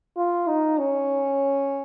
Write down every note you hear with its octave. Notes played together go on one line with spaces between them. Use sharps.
F4
D#4
C#4